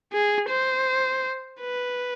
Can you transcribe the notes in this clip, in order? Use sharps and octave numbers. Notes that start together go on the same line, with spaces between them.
G#4
C5
B4